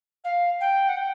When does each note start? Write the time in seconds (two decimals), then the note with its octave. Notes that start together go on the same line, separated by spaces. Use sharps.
0.24 F5
0.60 G5
0.88 F#5
0.96 G5